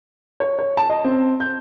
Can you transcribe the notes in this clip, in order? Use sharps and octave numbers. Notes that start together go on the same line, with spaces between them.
C#5
C#5
A5
D#5
C4
G6